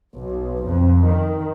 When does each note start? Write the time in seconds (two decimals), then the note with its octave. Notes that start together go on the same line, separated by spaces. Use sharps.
0.13 B1
0.65 F2
1.06 D#3